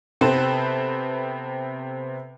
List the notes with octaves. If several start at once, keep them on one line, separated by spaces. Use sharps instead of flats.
C3 B3 C4 A4 B4 C5